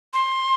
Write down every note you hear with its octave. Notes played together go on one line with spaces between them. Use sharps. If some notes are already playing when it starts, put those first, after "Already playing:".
C6